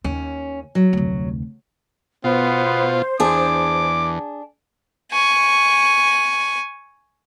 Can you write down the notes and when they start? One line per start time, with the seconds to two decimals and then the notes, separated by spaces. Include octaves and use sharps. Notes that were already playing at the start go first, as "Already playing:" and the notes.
0.04 D#2 C#4
0.75 F#3
0.93 F1 D2
2.24 B2 B3 F4 C5
3.20 E2 D4 G#4 D6
5.12 G#5 C#6